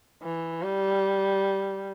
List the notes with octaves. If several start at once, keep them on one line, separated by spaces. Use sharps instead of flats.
E3
G3